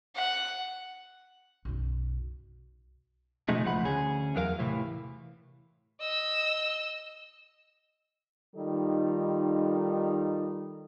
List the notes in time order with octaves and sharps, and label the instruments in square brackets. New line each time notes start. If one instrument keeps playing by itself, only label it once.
[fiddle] F#5
[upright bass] B1 F#2
[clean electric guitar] B2 D3 F3 G#3 A3 D#4
C#2 F3 A3 F#5 B5
D2 C#4 G#4
E2 F#3 A#4 F5
A2 C3 E3
[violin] D#5 E6
[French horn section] D#3 G3 D#4 F4 A4